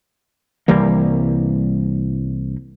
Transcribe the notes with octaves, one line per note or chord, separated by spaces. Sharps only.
C2 E3 G3 A#3